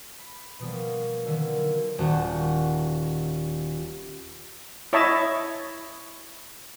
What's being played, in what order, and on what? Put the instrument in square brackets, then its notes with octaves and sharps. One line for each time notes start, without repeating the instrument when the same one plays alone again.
[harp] B5
B2 F3 G3 A#3
D3 D#3 F#3 A3 A#3 C#4
D#1 F#4
[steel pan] E4 C#5 D#5 E5 A5 B5